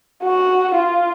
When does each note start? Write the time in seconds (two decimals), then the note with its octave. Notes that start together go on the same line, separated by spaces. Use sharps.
0.24 F#4
0.75 F4